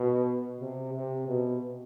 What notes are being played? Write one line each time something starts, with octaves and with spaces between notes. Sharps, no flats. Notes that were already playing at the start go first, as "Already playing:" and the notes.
Already playing: B2
C3
C3
B2